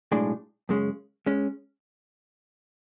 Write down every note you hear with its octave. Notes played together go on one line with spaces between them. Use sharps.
B1 A2 G#3 D4
F#2 C#3 G#3 C#4
G#3 C#4